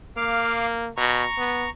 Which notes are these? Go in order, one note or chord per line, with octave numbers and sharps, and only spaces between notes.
A#3 F5 D6 F6
B2 A#5 C#6
B3